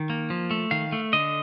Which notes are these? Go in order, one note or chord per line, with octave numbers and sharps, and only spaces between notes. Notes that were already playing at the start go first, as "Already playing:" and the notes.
Already playing: D#3
A#3
F3
A3
D#3 F5
A3
D3 D#5